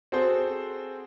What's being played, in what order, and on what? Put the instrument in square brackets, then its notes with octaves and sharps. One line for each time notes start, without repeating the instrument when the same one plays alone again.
[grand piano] C4 F#4 G#4 A4 C5